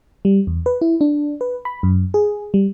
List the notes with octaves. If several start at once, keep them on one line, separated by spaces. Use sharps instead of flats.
G3
E2
B4
E4
D4
B4
B5
F#2
G#4
G3